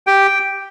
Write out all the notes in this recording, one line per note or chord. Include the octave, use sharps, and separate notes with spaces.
G4 G5